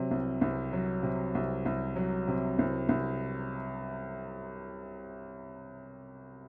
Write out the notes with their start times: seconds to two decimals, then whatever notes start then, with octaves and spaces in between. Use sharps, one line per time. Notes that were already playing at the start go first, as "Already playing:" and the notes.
Already playing: C3 F#3
0.11 C2
0.41 C2
0.73 F#3
1.03 C3
1.35 C2
1.65 C2
1.96 F#3
2.28 C3
2.59 C2
2.89 C2